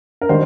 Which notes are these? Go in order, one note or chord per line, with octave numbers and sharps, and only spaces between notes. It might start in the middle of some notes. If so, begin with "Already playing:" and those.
A#4
D#3 G3 C5